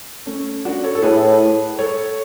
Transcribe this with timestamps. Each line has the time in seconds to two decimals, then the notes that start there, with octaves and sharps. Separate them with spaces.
0.26 A3 C#4
0.65 D4 F#4
0.83 A4 C#5
0.95 A4
1.02 A2 G#4 B4
1.79 A4 C#5